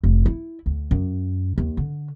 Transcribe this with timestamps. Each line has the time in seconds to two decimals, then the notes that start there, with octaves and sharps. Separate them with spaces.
0.03 F1
0.26 E4
0.66 D2
0.91 F#2
1.58 D#2
1.77 D3